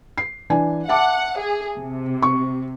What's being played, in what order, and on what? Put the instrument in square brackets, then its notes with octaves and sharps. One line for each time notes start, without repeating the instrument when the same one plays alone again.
[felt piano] C7
E3 D4 G#5
[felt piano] E5 A5 D6 [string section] F#5
[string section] G#4
C3
[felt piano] C#6